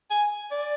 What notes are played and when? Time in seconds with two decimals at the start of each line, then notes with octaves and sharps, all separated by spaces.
0.10 G#5
0.51 D5